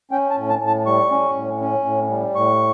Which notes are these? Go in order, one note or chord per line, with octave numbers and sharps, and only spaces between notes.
C#4 G5
A5
A2
A5
A2
A5
G3 C#6
C#4
A2
C#4
A2
G3
A2 C#6